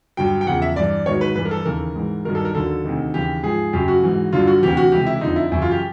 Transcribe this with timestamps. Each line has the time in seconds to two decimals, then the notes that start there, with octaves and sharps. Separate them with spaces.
0.17 G2 D3 F#3 G5
0.41 G5
0.47 E2 C#3 F3 F#5
0.62 E5
0.76 G2 E3 D5
1.06 G#2 D#3 F#3 C#5
1.21 B4
1.35 G2 E3 B4
1.45 A#4
1.51 A4
1.65 D#2 C#3 E3 A#4
1.95 G#2 E3
2.25 G2 D#3 F#3 A#4
2.35 A4
2.45 A#4
2.55 D#2 D3 F#3 A4
2.84 D2 C3 D#3
3.14 D#2 C#3 E3 G4
3.43 G#2 F3 G#4
3.73 F#2 C#3 F#3 G4
3.88 F#4
4.03 G#2 E3
4.33 G2 D3 F#3 F4
4.47 F#4
4.62 D2 C3 E3 G4
4.77 F#4
4.92 C#2 C3 E3 G4
5.06 E4
5.21 F2 D3 F3 D#4
5.36 E4
5.52 F#2 C#3 E3 E4
5.62 F4
5.71 G4